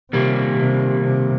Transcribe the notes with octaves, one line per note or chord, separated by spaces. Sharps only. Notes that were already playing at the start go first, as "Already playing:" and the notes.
C3 D#3 G3 A#3
C3
C3